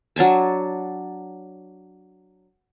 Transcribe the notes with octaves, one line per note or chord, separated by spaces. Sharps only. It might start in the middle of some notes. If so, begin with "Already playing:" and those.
F#3 D4 G#5 A5